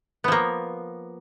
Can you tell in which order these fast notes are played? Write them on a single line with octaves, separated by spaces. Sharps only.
B3 F3 A#3